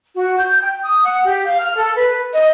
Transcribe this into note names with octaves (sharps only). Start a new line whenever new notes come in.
F#4
G6
G5
D#6
F#5
G4
F5
F6
A4
B4
D#5